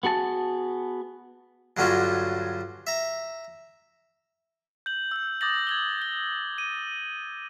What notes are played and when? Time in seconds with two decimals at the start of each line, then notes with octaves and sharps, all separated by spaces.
0.03 B3 F#4 G#4 A5
1.77 G2 D3 F#3 C#4 F4 F#4
2.87 E5 A#5
4.86 G6 F#7
5.11 E6 G6
5.41 D6 D#6 G6 A6 A#6 F#7
5.67 G#6 F#7 G7
5.98 G6 G7
6.58 D#7